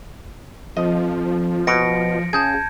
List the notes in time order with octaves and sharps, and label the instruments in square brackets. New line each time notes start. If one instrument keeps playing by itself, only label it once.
[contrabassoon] F2 [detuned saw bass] F3 [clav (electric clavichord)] D#5
[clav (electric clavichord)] B2 [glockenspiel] A#6 C#7 D7
[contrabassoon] C#3 [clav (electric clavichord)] G#4 [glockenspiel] A5 G6 G#6